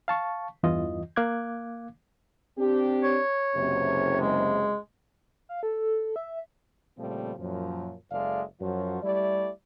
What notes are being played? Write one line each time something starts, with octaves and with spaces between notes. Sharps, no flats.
F5 A5 C#6
E2 G2 E3 F4 D#5
A#3 F5 D6 F#6 G#6
C4 D4 G4
C#5
F#1 C#2 C3
G#3
F5
A4
E5
A#2 C#3 F3 G3 A3 C4
F#2 A#2 F3
F#1 G#3 A4 D5 E5 F5
F#2 F3 F#3 F4 F#4
G3 A3 E4 G4 D5